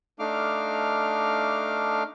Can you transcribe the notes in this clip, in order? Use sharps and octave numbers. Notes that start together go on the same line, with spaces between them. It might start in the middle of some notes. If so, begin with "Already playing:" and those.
A3 D4 D#4 F5 D6 F6